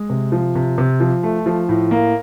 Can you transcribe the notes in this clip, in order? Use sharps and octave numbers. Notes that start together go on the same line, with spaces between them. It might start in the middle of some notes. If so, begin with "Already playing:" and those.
Already playing: G#3
C3
F3
C3
C3
F3
A3
F3
A2
A#3